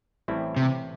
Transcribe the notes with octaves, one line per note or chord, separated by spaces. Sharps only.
A1 A2 G3 C4 E4
C3